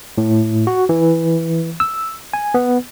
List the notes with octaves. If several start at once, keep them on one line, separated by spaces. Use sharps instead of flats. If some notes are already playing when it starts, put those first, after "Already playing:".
A2
F#4
E3
E6
G#5
B3